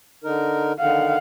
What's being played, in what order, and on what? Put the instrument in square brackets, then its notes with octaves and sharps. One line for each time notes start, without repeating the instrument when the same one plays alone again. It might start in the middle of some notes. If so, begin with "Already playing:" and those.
[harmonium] D3 D#4 A#4
[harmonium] D3 D#3 [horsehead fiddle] F5 F#5